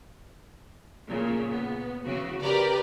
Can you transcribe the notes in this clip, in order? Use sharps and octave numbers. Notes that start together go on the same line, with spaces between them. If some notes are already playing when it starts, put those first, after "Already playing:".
A#2 C#3
B3
C#3 E3 F#4
G4 A#4 B4 D5